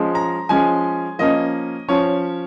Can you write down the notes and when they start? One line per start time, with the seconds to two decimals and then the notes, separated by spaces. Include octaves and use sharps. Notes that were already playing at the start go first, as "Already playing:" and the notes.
Already playing: F3 G#3 C#4
0.15 A#5
0.49 F3 G#3 C#4 G#5
1.19 F3 A#3 C#4 D#5
1.88 F3 C#4 C#5